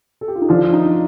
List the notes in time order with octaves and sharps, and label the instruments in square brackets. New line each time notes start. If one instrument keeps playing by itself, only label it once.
[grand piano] A4
G4
F4
D#4
[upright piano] F3 [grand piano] D4
[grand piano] D#4